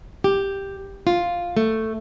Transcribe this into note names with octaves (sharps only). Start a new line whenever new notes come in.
G4
F4
A3